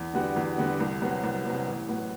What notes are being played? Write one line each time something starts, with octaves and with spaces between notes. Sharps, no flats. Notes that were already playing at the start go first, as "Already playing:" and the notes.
Already playing: E2
D3 G3 B3 F#4
E2
D3 G3 B3 F#4
C2
C3 F#3 B3
C2
C3 F#3 B3
A1
A2 F#3 B3